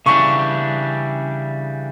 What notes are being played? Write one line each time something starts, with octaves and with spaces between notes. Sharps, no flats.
C#3 E3 G3 D4 C#6